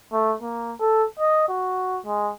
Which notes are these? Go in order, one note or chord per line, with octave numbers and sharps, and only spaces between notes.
A3
A#3
A4
D#5
F#4
G#3